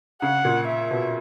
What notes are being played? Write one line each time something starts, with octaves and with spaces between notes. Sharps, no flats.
C#3 F#5
A#2
E5
B2